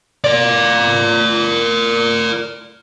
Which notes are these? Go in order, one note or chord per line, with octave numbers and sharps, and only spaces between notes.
A#4 D5